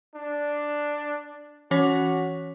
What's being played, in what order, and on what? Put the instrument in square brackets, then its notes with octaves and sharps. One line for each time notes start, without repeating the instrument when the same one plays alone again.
[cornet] D4
[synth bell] E3 C#4 C#5 [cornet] F#4